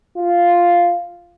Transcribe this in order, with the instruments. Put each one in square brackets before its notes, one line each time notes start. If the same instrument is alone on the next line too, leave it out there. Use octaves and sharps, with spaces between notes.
[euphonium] F4